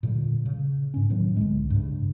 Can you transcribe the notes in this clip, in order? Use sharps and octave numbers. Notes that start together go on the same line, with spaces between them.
A#2 D3 E3 G3
C#3
G#2 C#4
A2 D#3 F#3 B3
C2 D3 G#3
G2 C#3